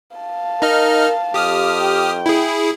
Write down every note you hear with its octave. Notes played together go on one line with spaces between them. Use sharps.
F5 A5
D#4 A#4 D#5 F6
F2 G4 D#6 F6
G5
E4 G#4